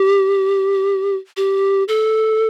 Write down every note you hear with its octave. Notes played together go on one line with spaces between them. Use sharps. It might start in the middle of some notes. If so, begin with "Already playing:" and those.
Already playing: G4
G4
A4